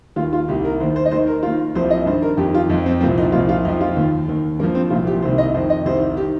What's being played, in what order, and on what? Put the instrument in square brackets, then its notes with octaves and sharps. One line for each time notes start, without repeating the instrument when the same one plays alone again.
[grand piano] D#2 F4
D#3
F4
C2 C3 D#3 G4
A#4
D#3 C5
D#2
C5
D#5
D#2 D#3 C5
A#4
D#2 D#3 F4
C2 C3 F3 C5
D#5
G2 D#3 C5
A#4
F2 D#3 G4
F4
F2 D#4
F3
C4
C2 A#2 F3 C4
D#4
C2 A#2 F3 F4
F4
F2 D#4
F3
F4
D#2 D#3
D#2 D#3
G2 A#3
F3
C4
C2 A#2 F3 F4
G4
C2 C3 D#3 C5
D#5
F2 D#3 C5
D#5
C2 C3 D#3 C5
G4
D#3